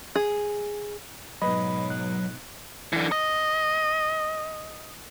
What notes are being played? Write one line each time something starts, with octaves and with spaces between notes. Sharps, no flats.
G#4
G#2 B2 F#3 B4 D#5 B5
F#6
D3 E3
D#5